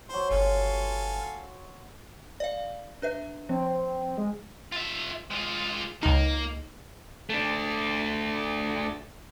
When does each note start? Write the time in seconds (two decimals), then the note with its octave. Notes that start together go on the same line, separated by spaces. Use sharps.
0.09 F#3 C5 C6
0.31 G1 A4 F5 G#5
2.40 D5 F5
3.02 D4 B4 E5
3.49 F3 C4
4.18 G#3
4.72 F4 E5
5.30 G#3 F4
6.03 C#2 A#3 D#4
7.30 A3 D4